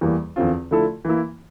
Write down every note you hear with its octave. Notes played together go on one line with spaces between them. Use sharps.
E2 E3 G3 A#3
E2 D3 F3 C4 F4
D3 F3 A3 E4 A4
E3 A#3 E4